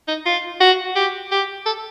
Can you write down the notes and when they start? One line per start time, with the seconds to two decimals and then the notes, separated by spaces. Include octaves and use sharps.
0.08 D#4
0.26 F4
0.61 F#4
0.96 G4
1.32 G4
1.66 A4